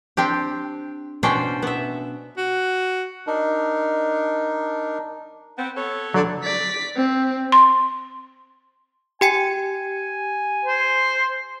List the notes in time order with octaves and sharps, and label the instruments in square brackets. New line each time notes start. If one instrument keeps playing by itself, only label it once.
[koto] C4 D4 G4
B2 C#4 D4 C5 G5
B3 E5
[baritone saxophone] F#4
[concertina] D4 D#4 A#4
[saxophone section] B3 C4
B3 A4 C#5
[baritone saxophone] D3 [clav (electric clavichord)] F#3 A5
[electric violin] D5 B6
C4
[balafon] C6
[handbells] G4 G5 C#7 [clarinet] G#5
[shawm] C5